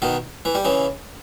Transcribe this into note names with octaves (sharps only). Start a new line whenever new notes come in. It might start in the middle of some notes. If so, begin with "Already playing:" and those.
B2 D#3
E3
G3
C#3 E3